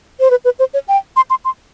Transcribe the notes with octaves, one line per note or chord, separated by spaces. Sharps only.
C5
B4
B4
C5
C#5
G5
C6
C6
C6